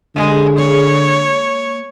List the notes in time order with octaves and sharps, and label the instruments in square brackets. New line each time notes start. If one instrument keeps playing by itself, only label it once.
[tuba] D3 [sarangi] G#3 [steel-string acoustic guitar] G4 G#4 F5
[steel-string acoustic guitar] A#3 G#4 [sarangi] C#5